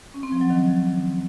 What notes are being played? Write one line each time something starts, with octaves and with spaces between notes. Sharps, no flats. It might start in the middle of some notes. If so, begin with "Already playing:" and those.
C#4
C4
F3
F#3
D#3